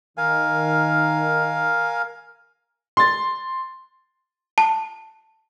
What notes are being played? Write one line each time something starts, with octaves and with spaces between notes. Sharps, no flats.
D#3 A#4 F5 G#5
C6 A6
A5